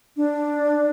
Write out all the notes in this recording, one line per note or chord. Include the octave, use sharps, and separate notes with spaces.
D4